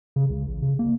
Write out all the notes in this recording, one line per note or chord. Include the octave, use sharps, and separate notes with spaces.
C#3
C#2
A1
C#3
A#3